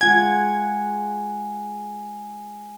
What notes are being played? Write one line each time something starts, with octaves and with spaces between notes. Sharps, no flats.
G#3 F4 F#5 G#5 G#6